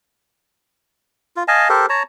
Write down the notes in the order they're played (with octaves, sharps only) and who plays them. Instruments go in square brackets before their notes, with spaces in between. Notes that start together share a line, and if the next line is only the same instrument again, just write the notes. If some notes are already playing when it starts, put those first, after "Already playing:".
[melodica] F4
D#5 F5 G#5 A5
G4 A4 A#4 C5
C#5 A5 A#5